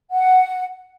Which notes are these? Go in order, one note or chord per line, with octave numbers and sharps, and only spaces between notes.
F#5